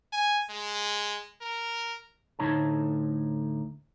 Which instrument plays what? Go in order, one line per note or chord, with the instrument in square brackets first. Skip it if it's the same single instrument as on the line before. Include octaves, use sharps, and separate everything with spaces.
[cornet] G#5
G#3
A#4
[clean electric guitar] D2 A2 F#3 D#4 C#5 A5